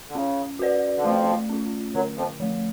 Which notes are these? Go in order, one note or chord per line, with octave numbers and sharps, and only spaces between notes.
D3
C#3 C#4
F#4 B4 D5
D3
F2 F3 A3
C#4 F4
F#2 D3 F#3
F2 F3
F3 A3